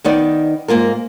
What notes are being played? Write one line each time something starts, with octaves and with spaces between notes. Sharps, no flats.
D#3 B3 D#4 D5
G#2 A#3 F4 A#4